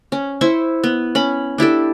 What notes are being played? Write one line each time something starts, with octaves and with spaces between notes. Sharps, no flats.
C#4
E4 C5 C6 C#6
B3
C#4 B5
D4 E4 G4 A4